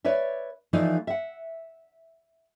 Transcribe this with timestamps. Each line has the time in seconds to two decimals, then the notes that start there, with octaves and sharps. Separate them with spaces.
0.05 B4 C#5 D5 E5
0.73 E3 F3 A3 D#4 E4 D5
1.07 E5 F#5